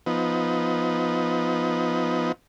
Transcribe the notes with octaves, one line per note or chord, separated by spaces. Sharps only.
F3 B3 D#4